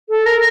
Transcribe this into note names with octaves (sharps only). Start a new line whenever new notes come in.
A4
A#4